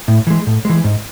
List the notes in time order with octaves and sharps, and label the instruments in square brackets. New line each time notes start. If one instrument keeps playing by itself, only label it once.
[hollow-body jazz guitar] A2
E3 G#3
A2
E3 G#3
G#2